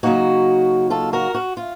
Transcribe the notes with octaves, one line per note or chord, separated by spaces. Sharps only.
C#3 F#3 A#3 D#4 F#4
F4 A4
F#4 A#4
F#4
F4